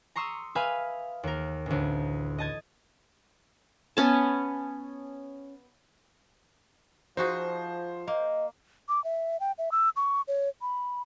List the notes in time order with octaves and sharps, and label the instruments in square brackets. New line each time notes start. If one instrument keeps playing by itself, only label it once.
[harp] A#5 C6 C#6 D#6 E6
B4 E5 F5 G#5 B5 D#6
D#2 A#4
A1 D2
D#5 A5 G#6
[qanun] B3 C#4 A5
[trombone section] F3 [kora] D#4 F#4 G#4 [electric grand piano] C5
[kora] A#3 [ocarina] D#5
[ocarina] D6
E5
G5
E5
E6
C#6
C#5
B5